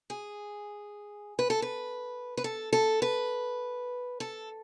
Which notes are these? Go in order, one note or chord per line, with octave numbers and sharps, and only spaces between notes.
G#4
B4
A4
B4
B4
A4
A4
B4
A4